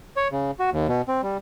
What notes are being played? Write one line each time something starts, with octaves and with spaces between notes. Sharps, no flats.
C#5
C#3
F#4
D#2
B2
C4
G3